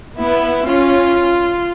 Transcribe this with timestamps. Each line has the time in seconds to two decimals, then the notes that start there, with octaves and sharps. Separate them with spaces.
0.18 B3 E4
0.68 C#4 F4